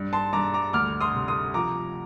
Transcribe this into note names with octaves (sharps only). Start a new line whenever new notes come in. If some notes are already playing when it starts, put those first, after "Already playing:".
Already playing: G2
A5 C6
G2 A#5 D6
A#5 D6
D2 D6 F6
C6 D#6
C3
C6 D#6
F3 A#5 D6